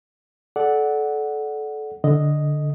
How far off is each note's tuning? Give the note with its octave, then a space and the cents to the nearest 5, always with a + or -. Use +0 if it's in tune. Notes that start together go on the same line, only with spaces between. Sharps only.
A4 -25 D5 +0 F#5 +0
D3 +0 D#5 +0